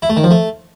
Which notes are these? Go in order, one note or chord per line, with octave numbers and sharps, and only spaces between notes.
E4
A3
D#3
F3
A3